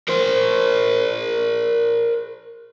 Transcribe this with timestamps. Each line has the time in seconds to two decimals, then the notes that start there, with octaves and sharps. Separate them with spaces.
0.08 A#4 C5